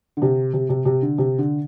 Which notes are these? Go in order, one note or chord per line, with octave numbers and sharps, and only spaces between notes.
D3
C3
C3
C3
C3
D3
C3
D3